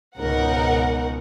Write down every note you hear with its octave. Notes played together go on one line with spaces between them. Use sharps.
C#2 G#2 B2 D#4 A#4 F#5